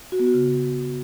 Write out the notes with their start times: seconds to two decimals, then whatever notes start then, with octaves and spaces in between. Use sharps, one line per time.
0.12 F#4
0.19 B3
0.27 F#4
0.34 C#3